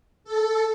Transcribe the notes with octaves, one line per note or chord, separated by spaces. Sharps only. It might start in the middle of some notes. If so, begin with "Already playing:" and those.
A4